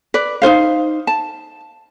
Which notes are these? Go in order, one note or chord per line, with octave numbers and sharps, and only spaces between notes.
B4 D5
D#4 F4 C5 F5
A5